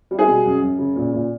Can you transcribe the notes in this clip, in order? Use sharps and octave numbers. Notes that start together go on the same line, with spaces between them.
G3
G#4
B2
F#2
F#2
C#3
A#2
A#2